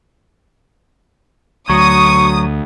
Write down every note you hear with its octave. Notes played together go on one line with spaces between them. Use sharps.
D2 F#3 C#6 D#6